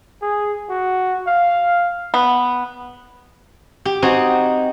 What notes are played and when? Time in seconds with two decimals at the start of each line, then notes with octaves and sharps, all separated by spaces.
0.22 G#4
0.70 F#4
1.27 F5
2.14 B3
3.85 G4
4.02 C4 D#4 F#4 G#5